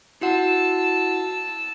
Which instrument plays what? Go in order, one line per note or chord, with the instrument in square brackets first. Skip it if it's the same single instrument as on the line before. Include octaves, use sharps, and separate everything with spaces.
[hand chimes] E4 F#4 F#5 [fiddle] A5 E6